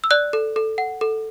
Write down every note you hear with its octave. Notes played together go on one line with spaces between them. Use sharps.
E6
D5 F#6
A4
A4
F#5
A4